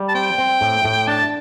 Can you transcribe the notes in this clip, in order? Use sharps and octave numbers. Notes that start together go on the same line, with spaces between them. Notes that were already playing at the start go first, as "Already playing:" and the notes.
Already playing: G3
A5
C4 G5
C4
A2
A2
D4 A5